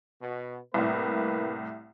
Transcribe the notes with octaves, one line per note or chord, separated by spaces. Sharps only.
B2
C2 A2 A#3 B4